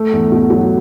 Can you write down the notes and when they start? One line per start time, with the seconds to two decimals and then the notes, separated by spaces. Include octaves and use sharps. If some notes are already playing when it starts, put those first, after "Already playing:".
Already playing: A3
0.13 E2
0.32 B2
0.50 F#3